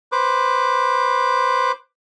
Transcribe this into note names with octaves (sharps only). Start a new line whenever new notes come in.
B4 C5 D6